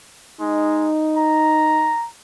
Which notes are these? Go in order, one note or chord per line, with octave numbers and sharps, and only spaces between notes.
G#3 D#4
A#5